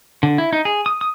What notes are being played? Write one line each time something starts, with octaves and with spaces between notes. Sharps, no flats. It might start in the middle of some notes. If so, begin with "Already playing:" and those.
D3
E4
D#4
G#4
D#6
D#6